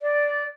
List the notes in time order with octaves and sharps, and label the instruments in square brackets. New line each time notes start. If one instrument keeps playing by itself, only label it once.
[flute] D5